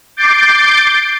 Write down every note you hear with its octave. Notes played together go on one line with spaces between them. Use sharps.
D6 G6 A6 C7 D7